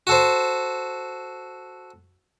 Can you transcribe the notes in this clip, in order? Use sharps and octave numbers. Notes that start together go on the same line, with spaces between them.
F#4 A4 C5